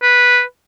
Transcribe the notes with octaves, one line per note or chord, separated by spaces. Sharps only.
B4